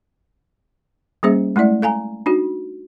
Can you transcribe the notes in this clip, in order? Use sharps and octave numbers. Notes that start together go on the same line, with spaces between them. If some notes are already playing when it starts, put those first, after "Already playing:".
G3 A#3 C#4 G#4 C5 E5
G#3 A3 E4 D5 E5
A4 F5 G#5 A#5
D4 D#4 F#4